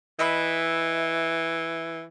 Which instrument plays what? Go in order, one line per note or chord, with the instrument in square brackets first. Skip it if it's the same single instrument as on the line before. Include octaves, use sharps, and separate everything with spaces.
[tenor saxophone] E3 [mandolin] D#5 E5 B5